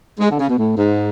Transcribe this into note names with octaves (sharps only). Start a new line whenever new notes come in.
G#3
D3
C#3
B2
A2
G#2